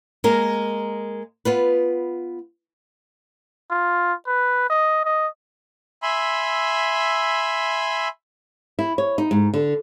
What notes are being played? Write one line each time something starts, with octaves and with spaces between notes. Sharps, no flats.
G#3 A#3 A#4
B3 F4 B4
F4
B4
D#5
D#5
E5 G#5 B5 C6 E6
E4
C#5
D#4
G#2
D3